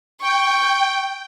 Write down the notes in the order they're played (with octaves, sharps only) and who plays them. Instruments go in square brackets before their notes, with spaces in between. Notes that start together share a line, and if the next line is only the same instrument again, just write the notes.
[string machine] G5 [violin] C#6